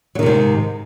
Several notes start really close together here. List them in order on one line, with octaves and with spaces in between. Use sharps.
F#3 D#3 C3 G#2